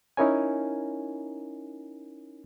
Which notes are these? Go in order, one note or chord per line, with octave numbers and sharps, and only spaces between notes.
C#4 D#4 E4 A#4 C#5 G#5